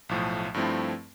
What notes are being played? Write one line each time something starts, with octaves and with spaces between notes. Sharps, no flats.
B1 A2 F3 A3
G2 F3 A3 C4 E4